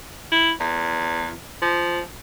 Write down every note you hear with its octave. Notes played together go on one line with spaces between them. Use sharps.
E4
E2
F3